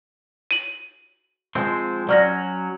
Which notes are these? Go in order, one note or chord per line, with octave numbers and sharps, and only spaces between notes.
D#7 F#7
F3 G#3 C4
F#3 C#4 D5 F6 A#6